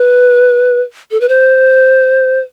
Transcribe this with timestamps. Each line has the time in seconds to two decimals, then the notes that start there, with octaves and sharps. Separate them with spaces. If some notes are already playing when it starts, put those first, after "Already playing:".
Already playing: B4
1.11 A4
1.21 B4
1.29 C5